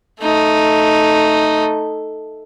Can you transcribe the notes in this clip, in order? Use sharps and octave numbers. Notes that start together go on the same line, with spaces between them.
A3 D#4